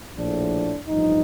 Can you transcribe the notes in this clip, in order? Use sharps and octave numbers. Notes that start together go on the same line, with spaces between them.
A#1 A2 F3 D4
A1 G2 F3 D#4